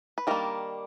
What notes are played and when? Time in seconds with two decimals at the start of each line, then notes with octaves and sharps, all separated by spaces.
0.18 B4
0.27 D#3 G3 A#3 D4 A#4